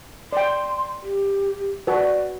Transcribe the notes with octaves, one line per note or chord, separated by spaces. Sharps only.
D5 G5 C6
G4
F#4 B4 D5